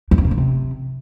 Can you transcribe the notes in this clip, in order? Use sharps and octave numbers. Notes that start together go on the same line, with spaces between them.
E2
F2
C3
D3
C3